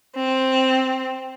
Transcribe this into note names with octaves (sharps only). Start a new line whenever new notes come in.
C4